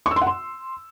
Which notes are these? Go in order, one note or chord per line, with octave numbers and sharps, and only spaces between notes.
C#6
E6
C6
F#5
C6